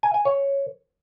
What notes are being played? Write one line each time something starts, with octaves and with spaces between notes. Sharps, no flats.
G#5
G#5
C#5